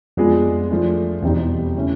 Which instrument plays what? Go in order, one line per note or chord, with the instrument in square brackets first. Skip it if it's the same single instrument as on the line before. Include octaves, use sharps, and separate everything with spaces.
[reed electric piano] F2 [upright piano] G#3 B3 D4 F4 G#4
[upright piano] F3 A3 D4
[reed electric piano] E2 [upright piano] B2 G3 C4 D#4 G4
[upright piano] C#3 E3 A3 C#4 E4